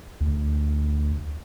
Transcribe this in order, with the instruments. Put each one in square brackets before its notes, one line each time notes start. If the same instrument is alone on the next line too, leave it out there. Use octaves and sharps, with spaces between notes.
[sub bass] D2